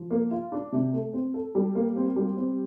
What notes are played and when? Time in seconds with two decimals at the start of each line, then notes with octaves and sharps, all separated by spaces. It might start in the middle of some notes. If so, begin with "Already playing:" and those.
Already playing: F3
0.11 A#3
0.31 F4
0.52 D4
0.72 C3
0.93 A3
1.13 C4
1.34 A4
1.55 G3
1.75 A#3
1.96 C4
2.16 G3
2.37 C4